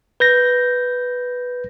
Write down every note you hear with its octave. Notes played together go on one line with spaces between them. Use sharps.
B4 G6 A#6